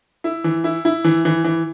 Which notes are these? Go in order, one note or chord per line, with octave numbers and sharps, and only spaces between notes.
E4
E3
E4
E4
E3
E3
E3